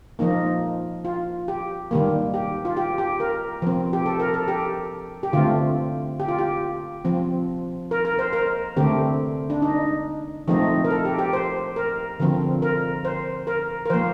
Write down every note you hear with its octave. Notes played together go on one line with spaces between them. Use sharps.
F3 A#3 D#4
F4
G4
D#3 G3 A#3
G4
F4
G4
G4
A#4
F3 C4
G4
A4
A#4
A4
G4
G4
D3 A3 C4 F4
G4
F4
G4
F3 C4
A#4
A#4
C5
A#4
D3 A3 C4 G4
D4
D#4
F3 A3 C4 D#4
A#4
A4
G4
G4
C5
A#4
D3 F3 C4
A#4
C5
A#4
A#4
F3 A#3 C5